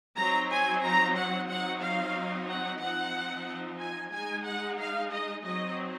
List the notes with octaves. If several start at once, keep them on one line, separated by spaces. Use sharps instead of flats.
F#3 C4 D#4 A#5
G#5
A#5
F#5
F#3 C4 D#4 F#5
F5
F#5
F3 C4 D#4 F#5
G#5
G#3 D#4 G#5
F#5
F5
D#5
F#3 C4 D#4 D#5